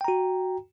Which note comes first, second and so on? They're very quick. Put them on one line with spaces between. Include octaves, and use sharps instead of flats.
G5 A#5 F#4